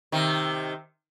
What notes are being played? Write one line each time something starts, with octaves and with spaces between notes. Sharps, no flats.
C3 D#3